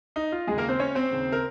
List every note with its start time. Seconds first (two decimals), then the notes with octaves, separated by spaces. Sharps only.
0.16 D#4
0.32 F4
0.47 D#2 C#3 G#3 G#4
0.58 A#3 A#4
0.68 C4 C5
0.79 C#4 C#5
0.95 C4 C5
1.11 D#2 C#3
1.32 A#4